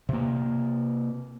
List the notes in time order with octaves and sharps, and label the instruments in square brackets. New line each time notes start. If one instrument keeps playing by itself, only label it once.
[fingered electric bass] C3 A#3